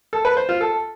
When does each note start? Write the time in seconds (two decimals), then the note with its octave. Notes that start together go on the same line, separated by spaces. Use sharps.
0.13 A4
0.25 B4
0.37 C5
0.49 F4
0.61 A4